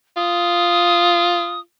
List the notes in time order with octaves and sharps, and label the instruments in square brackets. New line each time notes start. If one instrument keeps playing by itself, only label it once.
[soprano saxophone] F4 [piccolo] D#6